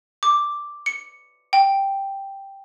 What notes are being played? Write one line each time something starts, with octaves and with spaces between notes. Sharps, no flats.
D6
C#7
G5